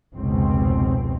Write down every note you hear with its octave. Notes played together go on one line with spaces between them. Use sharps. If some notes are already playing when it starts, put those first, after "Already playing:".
F1 C#2 B2 C4